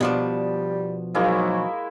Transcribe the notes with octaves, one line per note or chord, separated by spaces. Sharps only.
B2 F3 G3 D4
G#2 F#3 G#3 A#3 E4 F#4